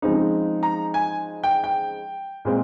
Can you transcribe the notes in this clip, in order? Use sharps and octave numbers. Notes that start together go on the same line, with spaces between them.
C#3 F3 G#3 C4 D#4
A#5
G#5
G5
G5
A#2 G#3 C4